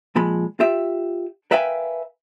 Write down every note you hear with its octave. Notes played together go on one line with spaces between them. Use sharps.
A#2 F3 G#3 B5
F4 G4 E5
A#4 B4 E5 F5 G5 G#5